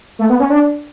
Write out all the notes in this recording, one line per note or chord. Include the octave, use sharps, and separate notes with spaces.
A3
B3
C#4
D4